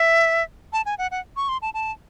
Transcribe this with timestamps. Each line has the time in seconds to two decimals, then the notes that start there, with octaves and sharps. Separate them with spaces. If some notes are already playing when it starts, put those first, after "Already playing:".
Already playing: E5
0.73 A5
0.86 G#5
0.98 F#5
1.11 F#5
1.36 C#6
1.49 C6
1.62 A5
1.74 A5